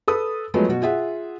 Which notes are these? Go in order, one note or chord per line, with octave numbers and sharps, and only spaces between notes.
A4 B4 D#6
F3 F#3 G#3 A3 B3
B2 F#4
F4 G#4 E5 F#5